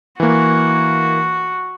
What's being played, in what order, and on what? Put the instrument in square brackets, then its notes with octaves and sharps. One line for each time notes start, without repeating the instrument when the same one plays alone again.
[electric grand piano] E3 A#3 [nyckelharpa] F#4